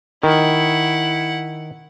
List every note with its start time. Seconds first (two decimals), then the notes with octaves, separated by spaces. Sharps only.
0.23 D#3 E4 F#5